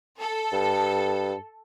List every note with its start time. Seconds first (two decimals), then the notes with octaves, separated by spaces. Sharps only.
0.19 A4
0.52 G2